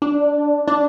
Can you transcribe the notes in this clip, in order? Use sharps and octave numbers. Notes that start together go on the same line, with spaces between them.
D4
D4